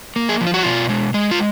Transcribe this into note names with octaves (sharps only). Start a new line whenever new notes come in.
A#3
G#4
F3
F4
F#4
B2 F4
G#3
G#3
F4